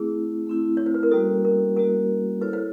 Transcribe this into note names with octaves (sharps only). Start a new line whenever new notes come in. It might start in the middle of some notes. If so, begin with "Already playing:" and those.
Already playing: A3 C4 E4 G#4
A3 C4 E4
C#5
C5
B4
A#4
G3 A#3 C#4 F#4 A4
A#4
G3 A#3 C#4 F#4 A#4
E4 A4 B4 C#5
C5